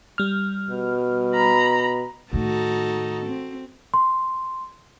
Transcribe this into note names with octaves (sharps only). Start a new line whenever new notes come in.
G3 F6
B2
A#5 B5
A2 D#3 D#4 F#4 A4
C4
C6